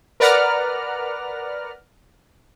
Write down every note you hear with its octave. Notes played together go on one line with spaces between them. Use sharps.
A#4 B4 D5 F#5 A#5 F6